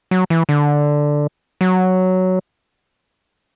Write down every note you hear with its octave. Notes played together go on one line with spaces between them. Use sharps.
F#3
E3
D3
F#3